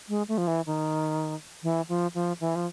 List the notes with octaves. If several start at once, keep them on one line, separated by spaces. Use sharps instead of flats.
G#3
A3
F3
E3
D#3
E3
F3
F3
E3
F3